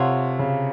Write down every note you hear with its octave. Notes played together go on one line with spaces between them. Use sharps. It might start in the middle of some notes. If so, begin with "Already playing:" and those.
Already playing: C3 F4 A4 C#5 F#5
C#3